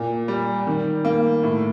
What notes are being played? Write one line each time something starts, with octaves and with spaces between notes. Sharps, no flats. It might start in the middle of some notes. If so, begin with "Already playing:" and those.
Already playing: A#2
G3
D#3
A#3
A2